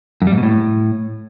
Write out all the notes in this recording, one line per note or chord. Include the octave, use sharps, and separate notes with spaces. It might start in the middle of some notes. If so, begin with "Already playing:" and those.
F#2
G3
G#2
B2
A2